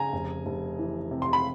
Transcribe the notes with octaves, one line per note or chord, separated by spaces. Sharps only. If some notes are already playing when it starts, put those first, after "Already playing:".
Already playing: C#3 G#5 A#5
F1
F1
E3
C3
C6
B5